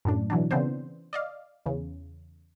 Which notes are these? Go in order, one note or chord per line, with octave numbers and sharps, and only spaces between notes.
F#2 A2 D4
B2 E3 F#3 D4
C#3 E3 B3 C4 D4 C5
D5 D#5 F5
E2 C#3